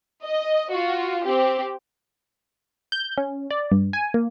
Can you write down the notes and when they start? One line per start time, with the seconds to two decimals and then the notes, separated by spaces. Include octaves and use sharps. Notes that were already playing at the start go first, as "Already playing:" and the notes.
0.24 D#5
0.72 F4 F#4
1.24 C4 G4
2.92 G6
3.18 C#4
3.51 D5
3.72 G2
3.93 G#5
4.14 A#3